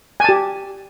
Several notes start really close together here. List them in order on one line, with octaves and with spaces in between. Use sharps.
G#5 A5 G4